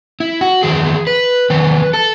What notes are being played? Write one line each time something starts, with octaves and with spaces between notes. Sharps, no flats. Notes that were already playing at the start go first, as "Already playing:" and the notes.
E4
F#4
E2 D#3 G#4
B4
E2 D#3 B4
A4